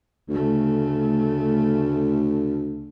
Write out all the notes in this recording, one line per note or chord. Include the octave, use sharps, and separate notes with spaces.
D2 C#3 A3